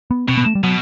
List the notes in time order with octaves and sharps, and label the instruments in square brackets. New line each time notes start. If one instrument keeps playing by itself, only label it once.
[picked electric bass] B3
[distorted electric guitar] B2 [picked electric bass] C4
[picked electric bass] B3
A3
G3
[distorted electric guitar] B2 [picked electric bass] F#3